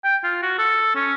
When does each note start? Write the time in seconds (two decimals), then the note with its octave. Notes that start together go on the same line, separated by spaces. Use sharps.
0.04 G5
0.23 F4
0.42 F#4
0.58 A4
0.95 C#4